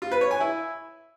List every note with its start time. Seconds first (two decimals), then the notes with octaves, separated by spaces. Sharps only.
0.02 F4
0.11 B4
0.21 C#5
0.31 G#5
0.40 E4